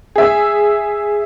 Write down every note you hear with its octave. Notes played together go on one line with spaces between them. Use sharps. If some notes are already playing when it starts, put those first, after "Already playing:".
G#4 E5